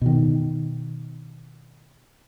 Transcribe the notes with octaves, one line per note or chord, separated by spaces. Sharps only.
B2 D#3